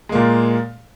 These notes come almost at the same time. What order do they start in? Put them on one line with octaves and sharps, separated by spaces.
G#3 A#3 A#2